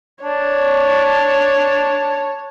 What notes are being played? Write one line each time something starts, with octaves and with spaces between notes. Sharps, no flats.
D4 C#5 A5